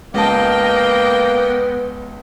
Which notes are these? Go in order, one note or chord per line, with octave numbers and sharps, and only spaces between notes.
C#2 A#3 B3 D#5 G5 A5